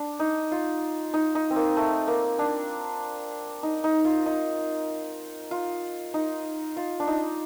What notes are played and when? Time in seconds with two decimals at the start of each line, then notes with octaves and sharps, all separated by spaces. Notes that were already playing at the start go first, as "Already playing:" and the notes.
Already playing: D4
0.20 D#4
0.52 F4
1.14 D#4
1.35 D#4
1.51 C4
1.56 A#3
1.77 A3
2.08 A#3
2.39 D4
3.63 D#4
3.84 D#4
4.05 F4
4.26 D#4
5.51 F4
6.14 D#4
6.77 F4
7.00 D4
7.07 D#4